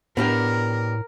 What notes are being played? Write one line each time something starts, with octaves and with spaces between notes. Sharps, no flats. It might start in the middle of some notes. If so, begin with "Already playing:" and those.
A2 B3 D4 G4 A#4